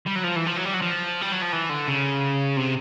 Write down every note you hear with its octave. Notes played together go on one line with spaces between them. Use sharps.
G3
F#3
F3
E3
F3
F#3
G3
F#3
F3
G3
F#3
F3
E3
D3
C#3
C3